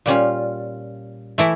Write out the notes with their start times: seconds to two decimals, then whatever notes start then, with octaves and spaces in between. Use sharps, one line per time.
0.06 A#2 G3 C#4 F4
1.38 E3 A3 E4